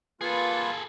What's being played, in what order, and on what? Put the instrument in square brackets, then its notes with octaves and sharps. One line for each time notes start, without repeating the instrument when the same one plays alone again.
[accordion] A#3 F4 B4 [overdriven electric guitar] G#4 A4